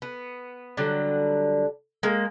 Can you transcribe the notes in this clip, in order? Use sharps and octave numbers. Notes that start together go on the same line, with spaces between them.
B3
D3 F#3 G3
G#3 A#3